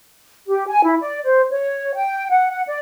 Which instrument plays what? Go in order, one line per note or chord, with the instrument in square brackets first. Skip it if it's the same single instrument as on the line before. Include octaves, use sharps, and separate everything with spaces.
[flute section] G4
G#5
E4
D5
C5
C#5
G5
F#5
F#5
D5